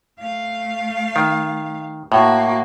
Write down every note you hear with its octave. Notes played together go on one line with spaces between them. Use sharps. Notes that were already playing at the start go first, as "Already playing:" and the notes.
A3 F5
D#3
A2 A#3 F#4